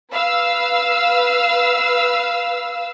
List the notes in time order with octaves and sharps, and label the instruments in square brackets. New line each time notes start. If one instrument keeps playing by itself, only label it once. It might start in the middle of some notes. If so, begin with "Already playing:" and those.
[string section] B4 F5 E6